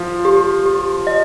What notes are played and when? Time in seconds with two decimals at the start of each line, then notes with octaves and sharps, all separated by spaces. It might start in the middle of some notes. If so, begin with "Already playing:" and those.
Already playing: F3 F5
0.25 G4
0.65 G4
1.07 D#5